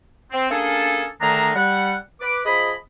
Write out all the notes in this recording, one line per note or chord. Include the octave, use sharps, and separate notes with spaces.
C4
A#3 C#4 D4 G#4 A4
D3 D#3 A3 D4 G#4 A#5
G3 F#5
B4 D6
F3 G#4 D#5 B5